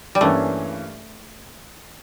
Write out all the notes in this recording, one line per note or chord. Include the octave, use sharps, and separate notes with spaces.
G3
G2 E3 A3 A#3 C#4